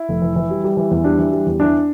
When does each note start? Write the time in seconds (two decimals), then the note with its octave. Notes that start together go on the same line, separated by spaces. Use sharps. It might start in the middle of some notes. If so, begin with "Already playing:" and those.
Already playing: E4
0.09 F1
0.22 E3
0.36 E3
0.50 G3
0.64 G3
0.77 E3
0.91 E2
1.04 G3 D4
1.19 E3
1.32 G3
1.46 E2
1.60 E3 D4